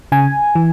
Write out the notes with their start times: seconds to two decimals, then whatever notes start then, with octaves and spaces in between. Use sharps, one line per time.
0.12 C#3 G#5
0.55 E3